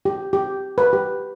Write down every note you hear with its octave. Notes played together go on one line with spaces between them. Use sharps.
G4
G4
B4
G4